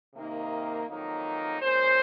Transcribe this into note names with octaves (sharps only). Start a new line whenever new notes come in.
C3 D#3 A#3 D#4
F2 D#3 F#3 A#3 D#4
A#2 G#3 C#4 C5